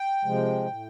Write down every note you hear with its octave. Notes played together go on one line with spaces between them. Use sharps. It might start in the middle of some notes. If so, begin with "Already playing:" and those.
Already playing: G5
C3 F3 G#3
A2